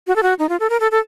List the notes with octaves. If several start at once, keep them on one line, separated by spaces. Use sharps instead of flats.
F#4
A4
F#4
D#4
F4
A4
A#4
A4
A4